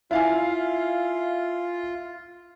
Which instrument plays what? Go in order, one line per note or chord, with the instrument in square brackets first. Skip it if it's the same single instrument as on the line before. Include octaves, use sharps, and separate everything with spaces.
[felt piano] E4 F5 G#5 [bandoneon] F4